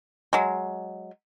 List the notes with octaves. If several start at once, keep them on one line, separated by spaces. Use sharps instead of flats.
F#3 G#3